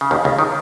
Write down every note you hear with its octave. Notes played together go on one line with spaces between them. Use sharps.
C#3
D#2 D#3
C#2 C#3
D#3